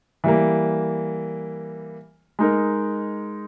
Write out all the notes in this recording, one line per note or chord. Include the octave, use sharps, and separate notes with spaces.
E3 G3 A#3
G#3 D#4 A#4